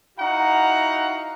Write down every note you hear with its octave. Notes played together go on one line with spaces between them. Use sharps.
D#4 E4 F#4 F5 F#5 A#5